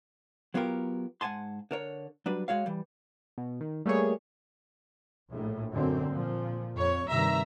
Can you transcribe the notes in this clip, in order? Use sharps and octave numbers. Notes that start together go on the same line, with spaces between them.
F#3 B3 F4 G4 A#4
G#2 F#5 G#5 A5 C6
D3 A#4 C#5
F#3 G3 D4 B4
G#3 F#4 C#5 F5
E3 G3
B2
D#3
G3 A3 A#3 G#4 C#5
A#1 A2
F#2 D3 C4
A#2 F3
F2 C#5
G2 C3 D#3 E5 A#5